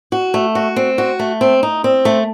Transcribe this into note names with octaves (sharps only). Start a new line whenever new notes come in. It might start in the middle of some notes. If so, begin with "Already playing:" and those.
F#4
A3
F#4
C4
F#4
A3
C4
D#4
C4
A3